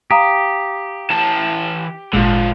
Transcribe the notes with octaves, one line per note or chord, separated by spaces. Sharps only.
G4 F5 A#5 D#6
E3 A5
G#1 A#2 D3 F3 G#3